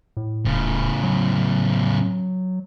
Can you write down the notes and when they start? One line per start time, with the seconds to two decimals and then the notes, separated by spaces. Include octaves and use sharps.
0.17 A2
0.45 D#1 A2 C#3
1.03 F#3